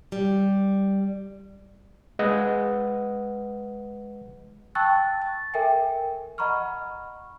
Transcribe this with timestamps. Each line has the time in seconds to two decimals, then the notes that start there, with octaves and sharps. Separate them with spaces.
0.12 G3
2.19 G#3 B4 D#5 F#5
4.75 G5 A5 C#6 E6 F#6 A6
5.22 A6
5.54 A4 A#4 E5 G5 G#5
6.38 D#5 F#5 A#5 B5 C#6 F6